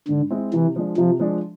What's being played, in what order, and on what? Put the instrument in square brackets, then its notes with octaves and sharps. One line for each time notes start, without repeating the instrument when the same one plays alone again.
[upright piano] G#2 [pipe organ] D3
[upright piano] G#3 C4 E4
[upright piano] C3 [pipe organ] E3
[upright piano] F3 G#3 D4
[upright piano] C3 [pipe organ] F3
[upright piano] F3 G#3 D4